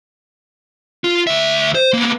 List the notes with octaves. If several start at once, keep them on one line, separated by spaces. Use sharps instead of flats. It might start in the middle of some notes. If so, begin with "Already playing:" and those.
F4
D2 E5
C5
A#3 B3